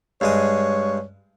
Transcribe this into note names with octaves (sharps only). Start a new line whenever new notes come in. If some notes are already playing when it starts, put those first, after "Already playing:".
G2 G#3 C#5 D#6